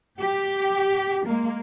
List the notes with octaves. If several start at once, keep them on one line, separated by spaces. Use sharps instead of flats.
G4
G#3 A#3